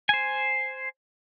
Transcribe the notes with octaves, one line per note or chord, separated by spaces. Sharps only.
C5 G#5